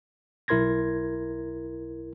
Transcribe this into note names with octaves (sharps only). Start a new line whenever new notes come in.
B1 E4 A#4 C6 G#6 A#6